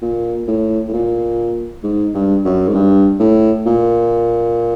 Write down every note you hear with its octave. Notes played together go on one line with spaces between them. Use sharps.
A#2
A2
A2
A#2
G#2
G2
F#2
G#2
G2
A2
A#2